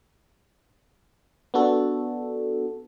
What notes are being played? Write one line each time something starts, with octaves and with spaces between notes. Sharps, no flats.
B3 D4 F#4 A4